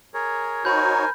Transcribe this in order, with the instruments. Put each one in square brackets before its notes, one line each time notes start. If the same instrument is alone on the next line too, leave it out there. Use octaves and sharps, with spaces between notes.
[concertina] G#4 A#4 C#5
[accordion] D#4 F#4 C#5 [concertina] A#4 C5 G#5 [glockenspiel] B5 G6